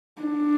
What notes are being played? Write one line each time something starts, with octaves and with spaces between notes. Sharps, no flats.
D4